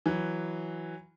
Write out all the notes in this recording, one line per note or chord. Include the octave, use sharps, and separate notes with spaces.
E3 F#3